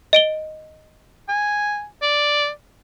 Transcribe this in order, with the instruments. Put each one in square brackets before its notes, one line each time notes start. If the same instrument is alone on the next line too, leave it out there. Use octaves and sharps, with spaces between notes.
[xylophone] D#5 D7 G7
[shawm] G#5
D5